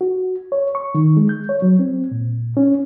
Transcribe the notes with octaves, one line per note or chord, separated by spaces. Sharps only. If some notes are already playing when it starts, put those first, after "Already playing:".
F#4
C#5
C#6
D#3
G#3
G6
C#5
F#3
C4
A#2
C#4